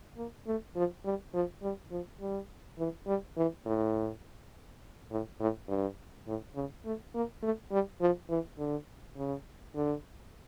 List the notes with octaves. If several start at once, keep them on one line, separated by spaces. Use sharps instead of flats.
A#3
A3
F3
G3
F3
G3
F3
G3
E3
G3
E3
A2
A2
A2
G2
A2
C#3
A3
A#3
A3
G3
F3
E3
D3
C#3
D3